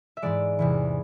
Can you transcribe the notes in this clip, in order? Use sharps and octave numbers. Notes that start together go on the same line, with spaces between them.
E5
G#2 E3 G#3 D5
E2 C3 E3